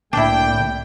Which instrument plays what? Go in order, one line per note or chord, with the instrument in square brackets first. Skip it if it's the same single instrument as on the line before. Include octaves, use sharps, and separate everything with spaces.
[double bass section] C2 A2 [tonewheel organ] D3 A#3 D5 [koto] D4 E4 [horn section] G5